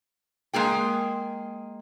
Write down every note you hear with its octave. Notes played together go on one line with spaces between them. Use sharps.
G#3 A#3 G#4 G5